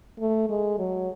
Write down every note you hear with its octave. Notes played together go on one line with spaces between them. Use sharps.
A3
G#3
F#3